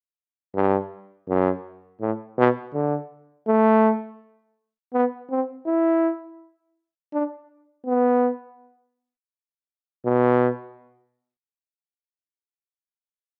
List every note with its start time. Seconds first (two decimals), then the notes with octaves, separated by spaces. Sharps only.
0.55 G2
1.28 F#2
2.01 A2
2.38 B2
2.74 D3
3.48 A3
4.94 B3
5.31 C4
5.66 E4
7.13 D4
7.86 B3
10.05 B2